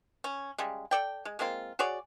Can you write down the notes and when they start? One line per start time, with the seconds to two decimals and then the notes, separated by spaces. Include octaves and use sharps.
0.24 C#4
0.58 C#3 G3 G#3
0.91 A4 D5 G5
1.25 G#3
1.39 G#3 A#3 C4 F4
1.79 F#4 G#4 C#5 D5